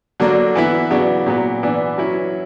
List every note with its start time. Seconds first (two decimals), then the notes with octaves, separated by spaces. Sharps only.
0.20 D3 F#3 A#3 D4
0.55 E3 B3 E4
0.91 C#3 F#3 B3 D4
1.26 A#2 F#3 B3
1.63 E3 B3 D4
1.98 F#3 C#4 E4